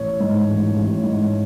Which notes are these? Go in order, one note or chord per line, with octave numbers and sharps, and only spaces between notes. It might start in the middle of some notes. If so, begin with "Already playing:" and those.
Already playing: A1 C#5
G#2
A1
A1
G#2